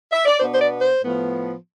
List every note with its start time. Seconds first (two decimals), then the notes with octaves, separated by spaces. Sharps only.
0.12 E5
0.26 D5
0.39 B2 B3 D4 C5
0.54 C5
0.60 D5
0.81 C5
1.03 A2 F3 B3